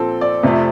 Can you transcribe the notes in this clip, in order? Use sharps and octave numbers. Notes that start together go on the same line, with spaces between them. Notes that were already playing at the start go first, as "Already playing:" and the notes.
Already playing: A#2 F3 C4 A4
D5
F2 C3 F3 A3